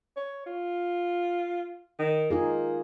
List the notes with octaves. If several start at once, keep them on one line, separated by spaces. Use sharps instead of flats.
C#5
F4
D#3
A#3 D#4 F4 G#4